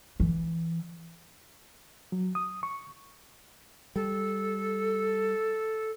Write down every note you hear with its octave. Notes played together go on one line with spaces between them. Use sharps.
E3
F#3
D#6
C#6
G3 A4